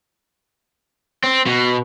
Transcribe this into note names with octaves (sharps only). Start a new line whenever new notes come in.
C4
B2